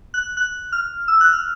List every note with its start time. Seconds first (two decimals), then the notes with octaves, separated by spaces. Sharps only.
0.14 F#6
0.37 F#6
0.72 F6
1.08 E6
1.21 F#6
1.33 F6